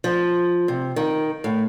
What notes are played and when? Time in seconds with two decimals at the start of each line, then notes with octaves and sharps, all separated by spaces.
0.04 F3
0.68 C3
0.96 D#3
1.44 A2